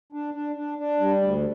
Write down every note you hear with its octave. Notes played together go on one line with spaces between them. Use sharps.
D4
D4
D4
D4
G3
D2